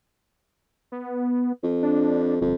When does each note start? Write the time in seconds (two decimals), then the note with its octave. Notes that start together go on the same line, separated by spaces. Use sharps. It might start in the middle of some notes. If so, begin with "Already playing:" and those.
0.92 B3
1.63 F2
1.83 D4
2.41 G1 F2